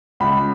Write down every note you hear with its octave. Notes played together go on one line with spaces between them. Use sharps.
C#2 B5